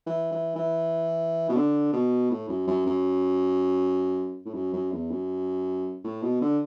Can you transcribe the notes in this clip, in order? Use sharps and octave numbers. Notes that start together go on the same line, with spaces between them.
E3
E3
E3
B2
D3
B2
A2
F#2
F#2
F#2
A2
F#2
F#2
E2
F#2
A2
B2
D3